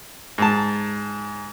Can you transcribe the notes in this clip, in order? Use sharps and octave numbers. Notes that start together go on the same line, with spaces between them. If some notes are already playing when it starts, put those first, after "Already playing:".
G#2 A5